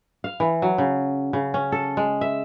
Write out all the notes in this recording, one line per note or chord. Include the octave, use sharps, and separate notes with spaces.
F5
E3
F#3
C#3
C#3
C#4
A4
G#3
E5